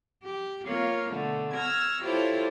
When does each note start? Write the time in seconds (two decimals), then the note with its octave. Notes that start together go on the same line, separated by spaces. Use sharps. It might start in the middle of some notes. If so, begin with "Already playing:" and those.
0.25 G4
0.67 A#3 F4 C#5
1.11 B2 D3 A3
1.55 C#6 E6 F6 G#6 A#6
2.03 E4 F4 G4 A4 C5 C#5